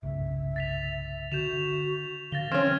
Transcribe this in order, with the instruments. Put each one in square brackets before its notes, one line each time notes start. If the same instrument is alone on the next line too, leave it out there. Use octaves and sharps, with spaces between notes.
[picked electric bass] G1 C2 C#3 [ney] E5
[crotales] A6 B6 F7
[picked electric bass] D3 [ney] F#4 [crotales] G6 E7 F7
[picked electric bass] D3 [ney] F5 [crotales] A6 A#6 G7
[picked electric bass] E3 F#3 [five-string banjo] C4 C#4 [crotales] F6 G#6 E7